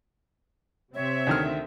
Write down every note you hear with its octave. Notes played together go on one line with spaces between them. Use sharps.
C3 C4 C#5 E5
D2 D#3 F6